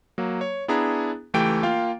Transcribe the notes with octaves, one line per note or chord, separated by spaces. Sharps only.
F#3 A#3
C#5
B3 D4 E4 G#4 A#5
C#2 E3 A3 G4 G5 D7
A#3 F4 F5 G5